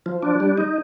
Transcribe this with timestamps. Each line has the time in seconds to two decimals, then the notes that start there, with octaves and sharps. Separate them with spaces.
0.06 F3
0.23 D4
0.40 G3
0.58 D#4